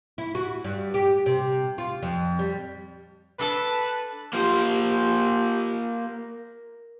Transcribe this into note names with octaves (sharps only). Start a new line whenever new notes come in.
E4
F#4
G2
G4
C3
F4
F2
G3
D4 A4 B4 A5
A#3 F4 G4 C5
A#4